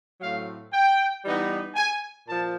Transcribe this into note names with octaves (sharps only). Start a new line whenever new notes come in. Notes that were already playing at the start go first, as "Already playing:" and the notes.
A2 F#3 A3 C4 F5
G5
E3 G3 B3 D#4
G#5
A#2 F3 A5